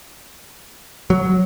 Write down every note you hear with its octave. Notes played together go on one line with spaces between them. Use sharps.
F#3